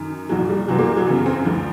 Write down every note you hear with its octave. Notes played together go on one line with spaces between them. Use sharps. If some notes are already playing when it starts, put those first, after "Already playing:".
Already playing: F#2 D#3
C2 A#2 F3 F#3
G3
C2 C3 E3 F#3
A#3
F#3
F#2 C#3 E3 B3
C4
D2 D3 F3